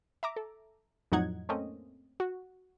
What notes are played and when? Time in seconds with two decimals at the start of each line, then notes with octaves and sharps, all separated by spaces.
0.23 E5 A#5 D6
0.36 A4
1.12 F2 A2 F#3 D#4 F#5 G#6
1.49 A3 A#3 C4 C#4 D#5
2.20 F#4